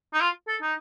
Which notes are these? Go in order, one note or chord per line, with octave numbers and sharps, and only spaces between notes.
D#4
F4
A4
D#4